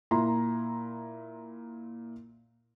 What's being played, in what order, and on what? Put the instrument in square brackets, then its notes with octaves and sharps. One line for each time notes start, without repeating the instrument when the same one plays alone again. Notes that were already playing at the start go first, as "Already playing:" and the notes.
[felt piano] A#2 E4 A#5 C6